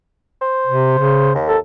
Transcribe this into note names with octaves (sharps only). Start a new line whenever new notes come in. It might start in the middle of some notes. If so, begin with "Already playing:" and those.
C5
C3
C#3
D#2
A4